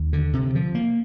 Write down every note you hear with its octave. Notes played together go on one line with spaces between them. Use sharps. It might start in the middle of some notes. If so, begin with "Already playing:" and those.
Already playing: D#2
D3
C3
F3
A#3